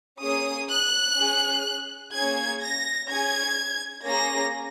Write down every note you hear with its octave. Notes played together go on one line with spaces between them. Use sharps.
A#3 C#4 G#4 D#6
F#6
C#4 G#4
A#3 C#4 G#4 G#6
A#6
C#4 G#4 G#6
A#3 C#4 G#4 A#6